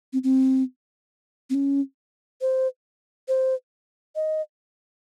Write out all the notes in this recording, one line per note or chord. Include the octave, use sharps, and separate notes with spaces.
C4
C4
C4
C#4
C5
C5
D#5